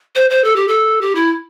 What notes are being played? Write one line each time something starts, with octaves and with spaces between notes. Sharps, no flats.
C5
C5
A4
G4
A4
G4
E4